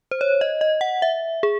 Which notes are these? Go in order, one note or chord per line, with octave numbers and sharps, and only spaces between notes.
C5
C#5
D#5
D#5
F#5
E5
G#4